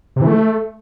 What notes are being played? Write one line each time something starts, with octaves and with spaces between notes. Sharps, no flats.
C3
E3
A3